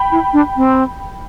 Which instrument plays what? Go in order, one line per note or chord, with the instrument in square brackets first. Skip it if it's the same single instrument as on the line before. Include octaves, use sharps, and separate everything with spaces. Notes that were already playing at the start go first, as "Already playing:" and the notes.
Already playing: [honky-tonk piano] G5 B5
[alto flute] E4
D4
C4